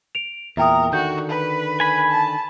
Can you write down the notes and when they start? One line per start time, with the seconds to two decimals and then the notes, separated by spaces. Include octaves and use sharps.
0.15 D7 F7
0.57 E2 A#2 A#4 E5 G5 D#6
0.93 D3 D#3 F#4 G6
1.30 B4
1.80 G#5 B5
2.10 A5